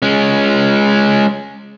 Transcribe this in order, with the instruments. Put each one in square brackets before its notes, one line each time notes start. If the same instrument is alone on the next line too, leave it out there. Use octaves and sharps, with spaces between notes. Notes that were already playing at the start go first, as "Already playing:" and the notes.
[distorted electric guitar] G#3 C#4